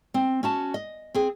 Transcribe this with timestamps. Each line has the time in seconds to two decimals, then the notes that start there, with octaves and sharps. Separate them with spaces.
0.14 C4
0.43 C#4 F#4 A5
0.74 D#5
1.14 C4 G#4